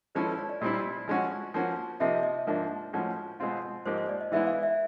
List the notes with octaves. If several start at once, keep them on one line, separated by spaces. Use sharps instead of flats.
F3 G#3 C#4 E4 A4 B4
B4
C#5
D5
A#2 G3 C4 E4 D#5
F3 G#3 C#4 F#4
F3 A#3 C#4 F#4
C3 F3 A#3 D#4 E5
D#5
G#2 F3 A#3 D4
A2 F3 G#3 C#4 F#4
B2 G#3 C4 F4
G#2 F3 A#3 D#4 G4 C5
C5
D5
D#5
E3 G#3 B3 E4 E5
F5
E5